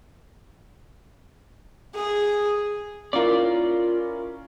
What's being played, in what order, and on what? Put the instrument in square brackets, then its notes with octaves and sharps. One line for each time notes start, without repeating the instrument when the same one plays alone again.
[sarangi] G#4
[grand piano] C#4 E4 A#4 [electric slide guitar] F4 D5